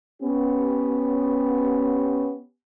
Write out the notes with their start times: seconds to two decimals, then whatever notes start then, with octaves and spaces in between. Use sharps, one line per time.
0.21 B3 C#4 G4